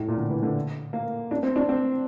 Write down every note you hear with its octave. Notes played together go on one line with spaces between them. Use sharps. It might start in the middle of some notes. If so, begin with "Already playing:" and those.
Already playing: A2
A#2
D3
E3
D3
A#3
D4
C4
D4
C4